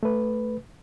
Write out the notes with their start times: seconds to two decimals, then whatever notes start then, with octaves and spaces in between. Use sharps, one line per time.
0.03 A3 B4